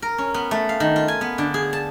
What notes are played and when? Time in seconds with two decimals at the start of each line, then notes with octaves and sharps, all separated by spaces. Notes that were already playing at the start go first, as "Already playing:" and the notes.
0.02 A#4
0.18 C#4
0.34 B3
0.51 A3
0.69 F5
0.80 D#3
0.96 F4
1.08 G#5
1.21 B3
1.38 D3
1.54 G#4
1.73 A5